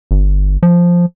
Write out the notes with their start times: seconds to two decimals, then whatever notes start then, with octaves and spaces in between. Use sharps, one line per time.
0.11 G1
0.63 F3